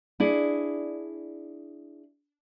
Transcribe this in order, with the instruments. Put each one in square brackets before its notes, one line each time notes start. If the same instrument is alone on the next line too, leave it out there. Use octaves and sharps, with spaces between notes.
[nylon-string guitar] D4 E4 G#4